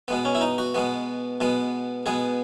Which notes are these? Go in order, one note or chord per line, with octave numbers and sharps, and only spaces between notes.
B2 G#3 B3
C#4
E4
D#4
F#4
B2 G#3 B3
B2 G#3 B3
B2 G#3 B3 G#4